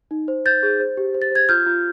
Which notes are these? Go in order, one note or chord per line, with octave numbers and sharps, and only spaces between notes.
D#4
C5
C5 G6 A6
G#4
C5
G4
C5
A6
C5 G#6
F4 F6 G6
F4